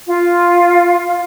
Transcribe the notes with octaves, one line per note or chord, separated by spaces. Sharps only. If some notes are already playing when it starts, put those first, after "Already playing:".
F4